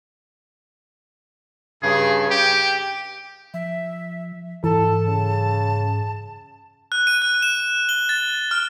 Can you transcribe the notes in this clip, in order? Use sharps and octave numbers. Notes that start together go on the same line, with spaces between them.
G2 C#3 G#4
G4 G5
F3 E5
G#2 E3 A4 A5
C#3
F#6
D#7
F#6
E7
G7
A6
F6